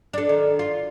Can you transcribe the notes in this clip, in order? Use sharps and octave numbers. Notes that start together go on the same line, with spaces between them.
D4 A4
D#3
F4